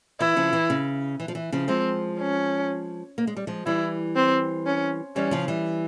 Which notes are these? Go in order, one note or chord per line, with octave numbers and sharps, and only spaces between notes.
E3 E4
C#3 F3
E3
C#3
E3
F3
E3
C#3 F3
F3 G#3 C4
C#4
A#3
G#3
G3
F3 G#3
E3 G3 E4
C4
C#4
E3 G3 C#4
C#3 F3
E3 G3